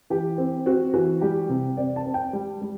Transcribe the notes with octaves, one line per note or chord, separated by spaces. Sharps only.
E3 G4
C4
C4 F#4
E3 F#4
G3 G4
C3
C4 D5
A5
C4
G5
G3
G3